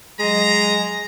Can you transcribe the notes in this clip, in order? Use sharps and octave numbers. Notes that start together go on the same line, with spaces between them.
F#3 G#3 D#5 A#5